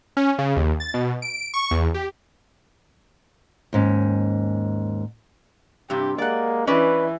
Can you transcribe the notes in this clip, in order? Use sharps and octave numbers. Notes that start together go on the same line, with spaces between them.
C#4
C#3
D#2
A6
B2
D7
C#6
E2
G4
D#2 G#2 C#4
G2 C3 G4
G#3 A#3 D5 F#5
E3 C#4 B4 D5 D#5